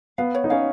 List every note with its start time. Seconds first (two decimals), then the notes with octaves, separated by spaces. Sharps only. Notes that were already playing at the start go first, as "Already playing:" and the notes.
0.18 B3 F5
0.35 C#5
0.44 D#4
0.50 C#4 F5